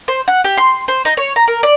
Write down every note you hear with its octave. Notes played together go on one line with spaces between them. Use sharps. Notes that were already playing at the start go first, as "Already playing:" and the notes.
C5
F#5
G4
C6
C5
D#4
C#5
A#5
A#4
D5